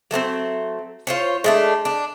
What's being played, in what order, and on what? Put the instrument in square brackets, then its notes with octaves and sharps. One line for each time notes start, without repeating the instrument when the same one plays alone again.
[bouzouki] F#3 A3 A#3 C4
F4 C5 C#5
G#3 A3 D4
D4